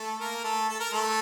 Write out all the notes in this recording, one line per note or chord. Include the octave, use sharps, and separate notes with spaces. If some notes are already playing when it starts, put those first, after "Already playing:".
Already playing: A3 A4
A#3 A#4
A3 A4
A4
A#4
A3 A4